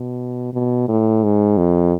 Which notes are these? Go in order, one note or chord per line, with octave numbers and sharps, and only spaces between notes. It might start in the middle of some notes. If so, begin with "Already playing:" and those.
Already playing: B2
B2
A2
G#2
F2